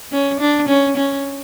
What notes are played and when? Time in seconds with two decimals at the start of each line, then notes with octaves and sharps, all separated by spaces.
0.12 C#4
0.40 D4
0.68 C#4
0.96 C#4